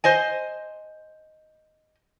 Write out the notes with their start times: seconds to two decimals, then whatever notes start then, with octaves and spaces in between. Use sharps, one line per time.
0.04 C5 D#5 G#5